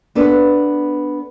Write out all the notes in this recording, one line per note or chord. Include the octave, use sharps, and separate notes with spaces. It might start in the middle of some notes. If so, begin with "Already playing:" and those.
B3 D4 A4 B4